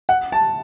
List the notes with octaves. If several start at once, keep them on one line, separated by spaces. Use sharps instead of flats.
F#5
A5